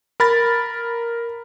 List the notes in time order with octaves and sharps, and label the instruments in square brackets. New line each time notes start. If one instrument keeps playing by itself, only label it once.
[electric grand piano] A#4 B5 A6